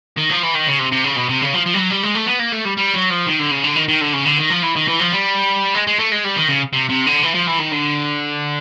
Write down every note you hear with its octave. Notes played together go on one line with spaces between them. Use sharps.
D#3
F3
E3
D#3
C#3
C3
C3
C#3
B2
C3
C#3
F3
F3
G3
F#3
G3
G#3
A3
B3
A#3
A3
G3
G3
F#3
F3
D#3
D3
C#3
D3
D#3
D#3
D3
C#3
D3
D#3
F3
E3
D#3
E3
F3
G3
G#3
G#3
A3
G#3
G3
D#3
C#3
C3
C3
D3
E3
F3
E3
D#3
D3